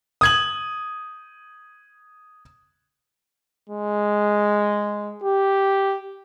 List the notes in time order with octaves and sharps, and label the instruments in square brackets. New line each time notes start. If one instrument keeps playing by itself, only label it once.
[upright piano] D#6 G#6 F#7
[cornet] G#3
G4